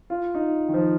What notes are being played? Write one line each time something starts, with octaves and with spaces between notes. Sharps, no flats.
F4
D#4
D#3
F3